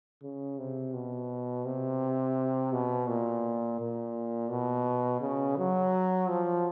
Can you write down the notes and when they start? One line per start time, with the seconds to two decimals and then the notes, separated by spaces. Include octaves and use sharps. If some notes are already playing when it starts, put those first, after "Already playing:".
0.23 C#3
0.58 C3
0.94 B2
1.65 C3
2.72 B2
3.08 A#2
3.80 A#2
4.51 B2
5.21 C#3
5.57 F#3
6.29 F3